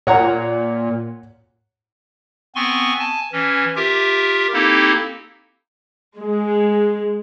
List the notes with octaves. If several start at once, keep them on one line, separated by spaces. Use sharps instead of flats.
A#2 C#5 F#5 A#5
B3 C4 G#5 C6 C#6
G#5 A5
E3 C#4
F4 G4 A#4 E5
A#3 C4 D#4 E4 G4 A4
G#3